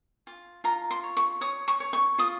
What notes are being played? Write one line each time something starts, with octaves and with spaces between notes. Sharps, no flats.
F4
F4 A#5
C6
C#5
C#6
C#5 D#6
C#6
C#5
C#6
F4 D#6